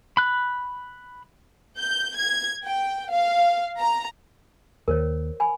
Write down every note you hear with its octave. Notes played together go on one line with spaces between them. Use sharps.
B5 F#6
G6
G#6
G5
F5
A#5
D#2 D#3 A#4 C5 C#5
G#5 B5